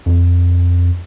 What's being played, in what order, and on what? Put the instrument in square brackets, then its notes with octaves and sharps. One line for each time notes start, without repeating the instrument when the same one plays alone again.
[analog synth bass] F2